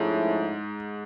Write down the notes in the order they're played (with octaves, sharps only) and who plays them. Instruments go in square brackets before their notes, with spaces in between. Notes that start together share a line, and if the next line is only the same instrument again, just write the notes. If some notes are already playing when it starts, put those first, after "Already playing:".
Already playing: [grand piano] G#2 [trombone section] F3 A3 C#4 E4